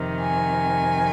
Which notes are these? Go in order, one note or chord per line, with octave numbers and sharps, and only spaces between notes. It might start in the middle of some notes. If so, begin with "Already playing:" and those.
Already playing: F2 C3 D#3
G#5